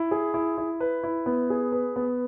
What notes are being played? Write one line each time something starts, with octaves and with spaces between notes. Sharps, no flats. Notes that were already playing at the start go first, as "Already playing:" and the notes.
Already playing: E4
G#4
E4
E4
B4
E4
B3
G#4
B4
B3